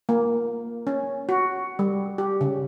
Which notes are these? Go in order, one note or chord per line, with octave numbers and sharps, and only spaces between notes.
A#3
C#4
F#4
G3
G4
C#3